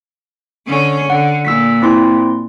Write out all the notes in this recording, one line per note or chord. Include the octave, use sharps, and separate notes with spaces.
D3 C#4
D3 F#5
A#2 E6 B6
C4 E4 C6